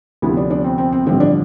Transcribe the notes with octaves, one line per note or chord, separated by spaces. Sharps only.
D2 C3 F3 B3 E4
D4
D4
C4
C4
C4
A1 G2 D3 F3 C4
D4